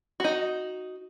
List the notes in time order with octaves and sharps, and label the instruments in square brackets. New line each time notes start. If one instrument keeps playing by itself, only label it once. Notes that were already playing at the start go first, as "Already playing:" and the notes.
[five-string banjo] D#4 F#4